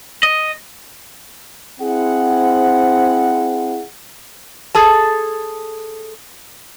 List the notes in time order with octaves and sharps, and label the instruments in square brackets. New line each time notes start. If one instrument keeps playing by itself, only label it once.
[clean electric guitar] D#5
[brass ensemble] C4 E4 G#4 F#5
[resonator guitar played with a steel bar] G#4 A4 A5